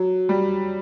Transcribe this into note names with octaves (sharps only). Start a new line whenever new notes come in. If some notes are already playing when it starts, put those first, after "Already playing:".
Already playing: F#3
G3